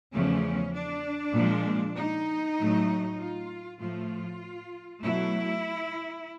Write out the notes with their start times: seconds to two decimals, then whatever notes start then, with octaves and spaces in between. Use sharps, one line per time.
0.12 E2 C#3 F3 A3 C#4
0.73 D4
1.34 A#2 F3 G#3
1.95 D#4
2.57 A2 F#3 A3
3.18 F4
3.79 A2 F3 A3 F4
5.02 B2 F#3 A3 E4